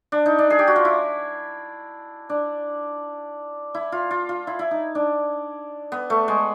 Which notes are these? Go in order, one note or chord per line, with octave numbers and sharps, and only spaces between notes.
D4
D#4
D4
G#4
G4
F#4
F4
E4
D4
E4
F4
F4
F4
E4
E4
D#4
D4
B3
A3
G#3